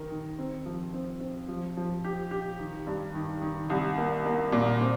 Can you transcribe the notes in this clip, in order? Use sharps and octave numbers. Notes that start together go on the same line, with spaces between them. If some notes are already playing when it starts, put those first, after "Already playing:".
Already playing: D#3 A#4
D#3
C4
F3
C4
C4
F3
F3
G4
G4
D#3
G2
D#3
D#3
C2
A#3
A#3
A#2
C4